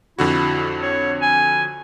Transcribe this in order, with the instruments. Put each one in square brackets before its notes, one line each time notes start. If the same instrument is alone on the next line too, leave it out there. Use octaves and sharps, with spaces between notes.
[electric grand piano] F2 D3 F#4 [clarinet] E4
[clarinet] C#5
G#5